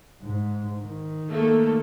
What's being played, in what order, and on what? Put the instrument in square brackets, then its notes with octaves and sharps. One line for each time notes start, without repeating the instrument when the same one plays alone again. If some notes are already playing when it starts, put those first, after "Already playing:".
[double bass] G#2
D#3
[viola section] A3 A#3 A4